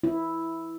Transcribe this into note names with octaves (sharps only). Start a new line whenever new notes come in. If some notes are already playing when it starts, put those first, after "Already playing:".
E4